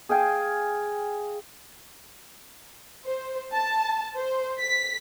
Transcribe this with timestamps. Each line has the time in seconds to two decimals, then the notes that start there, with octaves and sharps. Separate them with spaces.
0.09 G#4 F5 G5 G#5
3.05 C5
3.53 A5
4.15 C5
4.58 B6